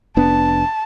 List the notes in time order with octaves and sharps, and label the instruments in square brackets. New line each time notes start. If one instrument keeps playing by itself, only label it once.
[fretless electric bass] F1 B3 D4 [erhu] A5